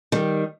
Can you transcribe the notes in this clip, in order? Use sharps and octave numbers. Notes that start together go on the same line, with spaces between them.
D#3 G3